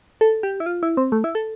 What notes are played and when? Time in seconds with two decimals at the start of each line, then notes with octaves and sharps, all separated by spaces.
0.21 A4
0.43 G4
0.60 E4
0.66 F4
0.83 E4
0.97 C4
1.12 A3
1.24 E4
1.35 A4